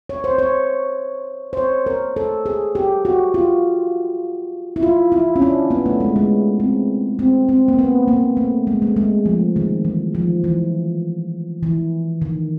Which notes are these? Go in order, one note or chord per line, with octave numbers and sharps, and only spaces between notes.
C#5
C5
C#5
C5
C#5
A#4
A4
G#4
G4
F#4
F4
E4
F4
E4
C#4
D4
B3
A3
G#3
G#3
C4
C4
C4
A#3
B3
A#3
A3
G#3
A3
G#3
F3
D#3
E3
F3
E3
E3
D#3